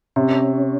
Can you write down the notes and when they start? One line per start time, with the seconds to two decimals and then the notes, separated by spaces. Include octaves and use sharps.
0.16 C3 C#4